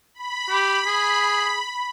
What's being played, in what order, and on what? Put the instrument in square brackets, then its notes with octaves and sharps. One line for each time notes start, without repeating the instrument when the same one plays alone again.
[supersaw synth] B5
[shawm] G4
G#4